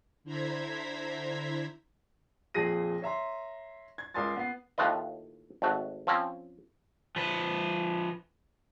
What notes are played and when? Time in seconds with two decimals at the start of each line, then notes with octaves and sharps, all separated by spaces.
0.24 D3 E4 C5 A#5 G#6 B6
2.54 F2 A#2 G#4 A#6 D#7
3.02 C#5 E5 A#5 C6
3.98 G#6
4.14 C#2 A#4 G#5 C6 A6
4.36 B3 C7
4.78 D#2 A2 A3 F4 B4 D#5
5.62 G#1 A3 F#4
6.07 F3 C4 C#4
7.16 F3 B4